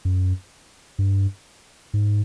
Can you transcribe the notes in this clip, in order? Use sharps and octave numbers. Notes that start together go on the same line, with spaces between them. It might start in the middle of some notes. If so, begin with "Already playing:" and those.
F#2
G2
G#2